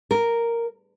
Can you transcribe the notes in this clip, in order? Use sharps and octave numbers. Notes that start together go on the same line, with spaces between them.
A#4